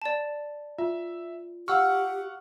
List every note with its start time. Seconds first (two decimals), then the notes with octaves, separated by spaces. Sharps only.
0.02 D5 A5
0.78 F4 E5
1.68 G4 F5 F#5 C#6 E6 F6